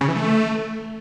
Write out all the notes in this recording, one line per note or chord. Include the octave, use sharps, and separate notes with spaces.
C#3
E3
A3